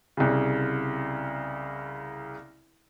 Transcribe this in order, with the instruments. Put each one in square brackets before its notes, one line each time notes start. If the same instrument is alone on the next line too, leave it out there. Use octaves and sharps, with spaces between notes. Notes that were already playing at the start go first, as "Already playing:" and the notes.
[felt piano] C2 C#3